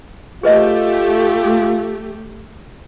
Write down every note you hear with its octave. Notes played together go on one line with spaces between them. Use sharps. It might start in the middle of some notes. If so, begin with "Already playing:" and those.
A3 F4 G4 G#4 B4 D#5